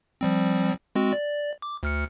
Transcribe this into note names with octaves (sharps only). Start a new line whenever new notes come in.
F3 G3 C4
G#3 C4 F#4
D5
D6
D2 F6 C#7